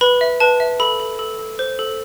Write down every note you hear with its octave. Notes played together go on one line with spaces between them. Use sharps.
B4 B5
E5
B4 A5
E5
A4 B5
A4
A4
A4
C5
A4